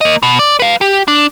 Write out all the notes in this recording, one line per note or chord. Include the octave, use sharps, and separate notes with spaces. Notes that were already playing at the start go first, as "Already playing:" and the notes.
A#3 D#5
B2
D5
B4 F5
G4
D4